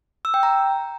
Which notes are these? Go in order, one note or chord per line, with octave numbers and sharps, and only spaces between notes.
E6
G5
A#5